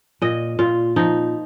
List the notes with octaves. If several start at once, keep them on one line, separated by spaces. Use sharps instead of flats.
A#2 D#5
A#2 F4
F3 D#4